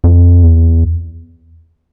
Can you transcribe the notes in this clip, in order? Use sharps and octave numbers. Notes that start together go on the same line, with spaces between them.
F2
E2